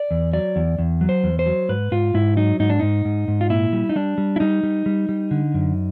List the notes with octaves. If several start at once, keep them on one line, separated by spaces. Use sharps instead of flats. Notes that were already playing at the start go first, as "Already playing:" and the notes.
Already playing: D5
E2
F#3 D5
E2
E2
F#3
C5
E2
C5
F#3
G#2 B4
G#2 F4
G#2 E4
F#3 D#4
G#2 D#4
D4
G#2 D#4
G#2
G#2
F4
A#2 E4
G3
D#4
G3 D4
G3
E4
G3 D#4
G3
G3
G3
D3
F#2